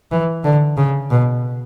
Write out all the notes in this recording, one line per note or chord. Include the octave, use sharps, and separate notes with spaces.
E3
D3
C#3
B2